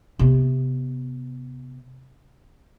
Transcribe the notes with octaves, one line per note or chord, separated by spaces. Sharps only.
C3 B3